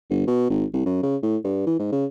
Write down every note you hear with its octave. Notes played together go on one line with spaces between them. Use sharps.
G1
B2
G#1
C2
F#2
C#3
A2
G2
E3
G#2
C#3